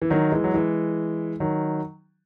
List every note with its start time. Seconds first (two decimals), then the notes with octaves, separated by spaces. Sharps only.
0.02 E3
0.10 D#3 F#3
0.32 E3 G#3
0.44 F#3
0.54 E3 G#3
1.40 D#3 F#3